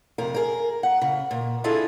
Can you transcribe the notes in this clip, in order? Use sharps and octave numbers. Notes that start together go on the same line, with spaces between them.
F2 C3 A#4
G#4 A#4
F#5
C#3
A#2
D4 E4 F4 G#4 A4 D#5